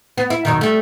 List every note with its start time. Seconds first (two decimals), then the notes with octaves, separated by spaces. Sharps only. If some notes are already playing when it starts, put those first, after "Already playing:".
0.17 B3
0.30 E4
0.45 F#2 B2 D#3
0.61 G3 A3